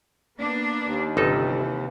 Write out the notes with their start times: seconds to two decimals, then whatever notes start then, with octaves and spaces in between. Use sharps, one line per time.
0.38 A#3 B3 D4
0.82 D#2
1.17 G1 C3 E3 D#4 A4